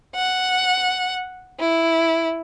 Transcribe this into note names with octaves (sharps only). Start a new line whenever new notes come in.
F#5
E4